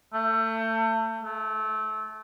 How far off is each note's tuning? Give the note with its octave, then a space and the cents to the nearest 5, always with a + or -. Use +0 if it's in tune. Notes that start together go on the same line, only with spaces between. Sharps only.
A3 +30
A3 -25